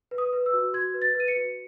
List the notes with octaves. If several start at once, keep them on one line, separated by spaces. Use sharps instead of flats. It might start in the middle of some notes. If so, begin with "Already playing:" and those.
B4
D#6
B4
E6
F#4
F#4 G#6
B4
A6
B4
D#7
C#7
F#4